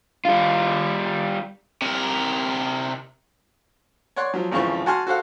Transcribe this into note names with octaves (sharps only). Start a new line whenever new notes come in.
G3 F4
C3 A#4
C#5 D5 F#5 C6 C#6
F3 F#3
G#1 F2 C#3 E3 F3 C#6
F#4 F#5 G#5 A5 C6 F6
F#4 A4 C5 F5 F#5